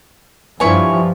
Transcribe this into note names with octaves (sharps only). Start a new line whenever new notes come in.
G2 F3 E4 C#5 G#5